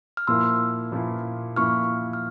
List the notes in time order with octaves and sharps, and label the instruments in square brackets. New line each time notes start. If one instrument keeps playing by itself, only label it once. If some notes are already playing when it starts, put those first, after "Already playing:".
[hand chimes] F6
[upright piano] A#2 F3 A#3 E4 [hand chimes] C6 E6
[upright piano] A#2 F3 A#3 E4
[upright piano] A#2 F3 A#3 E4 [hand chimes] C#6 F6
[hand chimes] F6